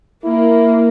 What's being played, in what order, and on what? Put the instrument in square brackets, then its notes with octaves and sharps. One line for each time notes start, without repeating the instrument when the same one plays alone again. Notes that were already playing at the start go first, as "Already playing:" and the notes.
[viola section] A#3 [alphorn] E4